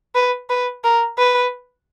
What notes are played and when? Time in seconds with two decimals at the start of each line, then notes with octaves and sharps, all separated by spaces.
0.15 B4
0.49 B4
0.84 A#4
1.18 B4